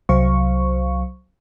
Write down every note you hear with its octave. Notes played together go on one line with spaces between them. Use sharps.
C2 F#3 C5 F5 C#6